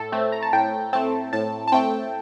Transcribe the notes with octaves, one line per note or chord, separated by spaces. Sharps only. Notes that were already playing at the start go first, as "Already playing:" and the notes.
Already playing: A2 A4
A3 C4
A#5
A5
A2 G5
A3 C4 A5
A2 A5
A5
A3 C4 G5